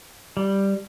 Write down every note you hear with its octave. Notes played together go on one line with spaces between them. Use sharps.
G3